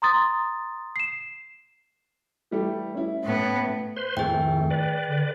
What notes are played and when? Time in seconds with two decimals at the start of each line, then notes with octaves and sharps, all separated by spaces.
0.02 A#5 C6 D#6 A6
0.96 C7 E7
2.51 E3 G3 A3
2.95 C#4 E4
3.24 A2 B3
3.97 B4 C5 C6
4.17 F2 A2 D#3 A3 G#4 G5
4.70 B4 D5
5.07 D3